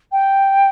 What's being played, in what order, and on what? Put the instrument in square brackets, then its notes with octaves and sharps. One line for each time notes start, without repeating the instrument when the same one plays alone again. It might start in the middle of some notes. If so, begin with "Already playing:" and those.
[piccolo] G5